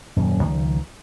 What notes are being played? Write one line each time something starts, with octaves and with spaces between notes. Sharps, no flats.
D#1 F#2
C#2 D#3 F3